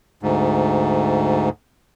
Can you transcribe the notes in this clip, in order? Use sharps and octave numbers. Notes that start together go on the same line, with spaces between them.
D2 G#2